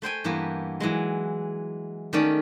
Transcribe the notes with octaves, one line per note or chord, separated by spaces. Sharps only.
A3 C5 G5 G#5
G2 E3 A#3 B3 G4
E3 F#3 G#3
D#3 A3 C#4 D5